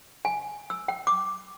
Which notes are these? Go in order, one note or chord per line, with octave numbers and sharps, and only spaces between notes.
G#5
E6
G5
D6